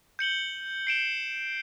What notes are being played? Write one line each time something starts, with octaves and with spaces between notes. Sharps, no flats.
G6 C#7 F#7 G7
C7 D7 E7 G7